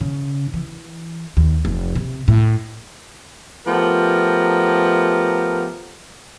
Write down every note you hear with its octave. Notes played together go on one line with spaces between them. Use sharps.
C#3
E3
D#2
F1
C3
A2
F3 A3 B3 G4 A#4